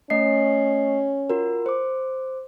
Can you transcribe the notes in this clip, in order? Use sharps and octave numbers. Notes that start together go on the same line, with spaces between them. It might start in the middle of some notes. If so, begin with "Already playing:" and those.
A3 C#4 D#5 C7
F4 F#4 A#4
C5 D6